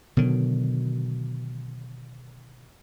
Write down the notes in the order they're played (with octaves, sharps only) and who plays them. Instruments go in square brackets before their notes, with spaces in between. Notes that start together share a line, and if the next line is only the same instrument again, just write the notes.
[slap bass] B2 D3 D#3 F#3